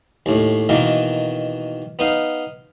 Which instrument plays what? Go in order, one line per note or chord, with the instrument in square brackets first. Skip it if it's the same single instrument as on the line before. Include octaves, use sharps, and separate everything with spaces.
[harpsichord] D#2 A2
B2 D#3 E3 A#3
B3 D#4 F5